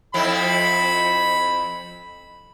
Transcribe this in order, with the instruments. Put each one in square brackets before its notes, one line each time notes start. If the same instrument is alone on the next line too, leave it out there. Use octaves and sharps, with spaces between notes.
[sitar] F2 C4 E4 [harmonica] B5